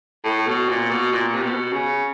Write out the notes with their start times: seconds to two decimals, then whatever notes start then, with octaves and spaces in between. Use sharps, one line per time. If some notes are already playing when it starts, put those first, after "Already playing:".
0.24 A2
0.46 B2
0.69 A#2
0.90 B2
1.12 A#2
1.34 C3
1.42 B2
1.72 C#3